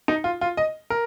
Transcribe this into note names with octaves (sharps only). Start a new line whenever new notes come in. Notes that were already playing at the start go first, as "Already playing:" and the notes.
D#4
F4
F4
D#5
A#4